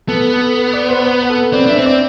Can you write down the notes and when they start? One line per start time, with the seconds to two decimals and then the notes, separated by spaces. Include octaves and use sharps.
0.08 B3 A4
0.33 A4
0.58 B4
0.73 D5
0.89 C5
1.05 B4
1.23 B4
1.29 A4
1.53 C4 D5
1.66 D4 E5
1.79 C4
1.86 D5